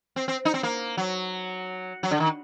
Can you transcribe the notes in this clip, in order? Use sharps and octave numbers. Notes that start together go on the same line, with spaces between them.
C4
C4
D#4
C4
A#3
F#3
F#3
D3
D#3